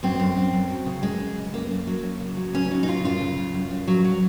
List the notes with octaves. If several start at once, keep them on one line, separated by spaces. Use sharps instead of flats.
F#2 C4
F#2
F#2
F#2
F#3
C#3
F#2 G#3
F#2
C#3
F#2 A#3
F#2
F#3
F#2
C#3
F#3
C#3 C#4
F#3 D#4
D#4
C#3 F4
F#2 F4
C#3
F#2
F#2
F#2
F#3
F#3